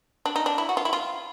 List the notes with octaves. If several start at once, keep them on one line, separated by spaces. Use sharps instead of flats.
D4
D#4
D4
E4
F#4
F4
E4
F4